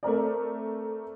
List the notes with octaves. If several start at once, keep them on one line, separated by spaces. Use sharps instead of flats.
A3 C4 A#4 D5